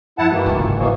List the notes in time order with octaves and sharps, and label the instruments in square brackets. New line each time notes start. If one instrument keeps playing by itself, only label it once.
[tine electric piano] F#2 F3 [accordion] E4 F#5 A5
[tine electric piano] G2 G#3 F#4 [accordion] D#3 E3 A#3
[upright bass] F#1 G#2
[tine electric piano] C3 F4 G#5
[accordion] B2 E3 A#3 [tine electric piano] C5 C#6 D#6